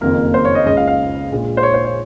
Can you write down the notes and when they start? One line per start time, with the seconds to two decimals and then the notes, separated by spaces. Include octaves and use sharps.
0.01 F#1 F2 D#3 A#3 A#4
0.34 C5
0.45 C#5
0.55 D#5
0.66 C#2 C#3 G#3 D#5
0.77 F5
0.87 F5
1.31 A#1 A#2 G#3
1.57 C5
1.63 C#5
1.74 C5
1.85 C#5